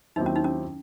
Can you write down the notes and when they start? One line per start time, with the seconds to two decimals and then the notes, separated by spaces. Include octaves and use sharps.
0.16 D#2 D#3 F#3 C4 D#4 E4
0.26 C#4
0.36 D#4
0.44 C#4